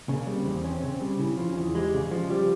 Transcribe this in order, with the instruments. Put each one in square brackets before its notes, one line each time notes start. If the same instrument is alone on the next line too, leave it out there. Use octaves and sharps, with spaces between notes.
[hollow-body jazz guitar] C#3 [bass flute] A#3
[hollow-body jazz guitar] G3
[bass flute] C4
[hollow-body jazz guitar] E2
C#4
C#3
G3
[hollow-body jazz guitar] C#3 [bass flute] E4
[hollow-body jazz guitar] F3 [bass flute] E4
[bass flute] C#4
[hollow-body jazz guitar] E2 [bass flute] E4
[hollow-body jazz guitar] G#3 [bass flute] G4
[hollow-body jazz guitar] C#3
[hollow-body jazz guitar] F3 [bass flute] F4
[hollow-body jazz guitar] G3 [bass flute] G4